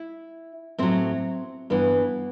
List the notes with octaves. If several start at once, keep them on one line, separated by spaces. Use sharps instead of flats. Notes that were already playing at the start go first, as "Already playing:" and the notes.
Already playing: E4
A2 F#3 C4
G2 E3 B3